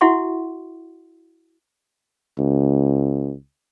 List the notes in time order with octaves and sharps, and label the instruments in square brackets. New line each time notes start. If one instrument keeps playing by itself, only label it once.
[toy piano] E4 F#4 E5 F#5 C6 C#6
[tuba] C#2